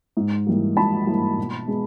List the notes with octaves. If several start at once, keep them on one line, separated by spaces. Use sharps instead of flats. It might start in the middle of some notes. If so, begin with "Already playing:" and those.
G#2
E3 G3 A#3
G#2 A5 B5
E3 G3 A#3
B2
G#3 B3